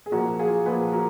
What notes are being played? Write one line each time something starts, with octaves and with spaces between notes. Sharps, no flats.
G#4
A#2 F3 F#4 A#4
F4 G#4
A#2 F3 G#4 B4
F#4 A#4